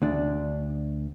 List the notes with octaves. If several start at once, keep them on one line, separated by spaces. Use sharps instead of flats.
D2 D4